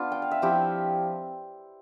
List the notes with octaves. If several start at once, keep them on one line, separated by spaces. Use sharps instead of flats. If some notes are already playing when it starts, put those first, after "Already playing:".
Already playing: B3 D4 F4
G5
F5
E5
F3 C4 E4 G4